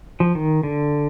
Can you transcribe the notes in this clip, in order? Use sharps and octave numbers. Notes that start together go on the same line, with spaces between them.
F3
D#3
D3